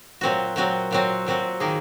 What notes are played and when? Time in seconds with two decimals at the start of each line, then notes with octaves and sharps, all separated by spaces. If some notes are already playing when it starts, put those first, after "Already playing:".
0.21 A#2 F#3 C4 F#4
0.56 A#2 F#3 C4 F#4
0.91 A#2 F#3 C4 F#4
1.26 A#2 F#3 C4 F#4
1.60 D#3 A#3 D#4 G#4